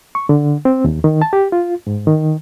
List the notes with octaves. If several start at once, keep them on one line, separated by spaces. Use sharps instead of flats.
C#6
D3
C4
D#2
D#3
A5
G4
F4
G#2
D#3